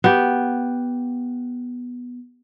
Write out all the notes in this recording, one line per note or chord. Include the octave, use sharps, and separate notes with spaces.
B3 G4